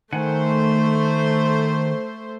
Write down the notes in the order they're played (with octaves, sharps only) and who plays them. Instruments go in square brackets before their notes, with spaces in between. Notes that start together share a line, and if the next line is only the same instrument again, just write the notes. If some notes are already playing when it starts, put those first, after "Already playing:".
[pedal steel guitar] D#3 F#5 G#5 [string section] A3 C5